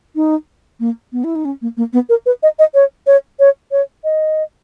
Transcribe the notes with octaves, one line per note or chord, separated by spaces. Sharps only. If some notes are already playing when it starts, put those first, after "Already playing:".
D#4
A#3
B3
E4
D#4
C#4
A#3
A#3
B3
A#4
B4
D#5
D#5
C#5
C#5
C#5
C#5
D#5